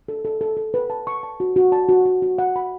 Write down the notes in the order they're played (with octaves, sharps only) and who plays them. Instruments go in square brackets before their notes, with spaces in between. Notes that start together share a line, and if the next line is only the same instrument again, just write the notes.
[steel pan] A4
A4
A4
A4
B4
A5
C#6
A5
F#4
F#4
A5
F#4
F#4
F#4
F#5
B5